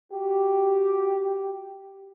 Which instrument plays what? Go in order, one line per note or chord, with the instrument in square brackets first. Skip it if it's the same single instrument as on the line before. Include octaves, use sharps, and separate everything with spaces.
[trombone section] F#4 G4